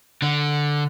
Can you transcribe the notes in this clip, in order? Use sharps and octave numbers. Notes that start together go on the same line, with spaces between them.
D3